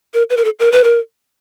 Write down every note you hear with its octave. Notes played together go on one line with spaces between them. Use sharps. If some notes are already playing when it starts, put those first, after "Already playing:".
A#4
B4
A#4
A4
A#4
B4
A#4